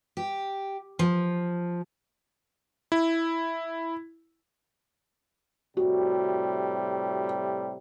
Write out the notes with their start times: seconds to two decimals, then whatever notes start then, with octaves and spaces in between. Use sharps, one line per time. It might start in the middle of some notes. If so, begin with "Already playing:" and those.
0.17 G4
0.99 F3
2.92 E4
5.77 A2 C3 G3 F#4